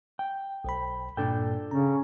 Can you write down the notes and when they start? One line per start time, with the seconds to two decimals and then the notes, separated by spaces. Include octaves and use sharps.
0.19 G5
0.64 B1 C5 B5
1.17 G2 A#2 D4 A4 G5
1.71 C#3 C#4 A#5